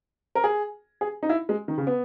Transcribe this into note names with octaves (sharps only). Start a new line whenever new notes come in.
A#4
G#4
G#4
D#4
E4
G#3
D#3
C#3
B3